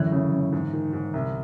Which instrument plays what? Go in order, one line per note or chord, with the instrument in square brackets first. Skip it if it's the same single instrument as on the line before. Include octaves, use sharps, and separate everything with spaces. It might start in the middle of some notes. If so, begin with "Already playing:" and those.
Already playing: [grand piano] F#2 A2 [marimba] D3 E3
[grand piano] C#3
F#2
G#2
D#3
G#2
C2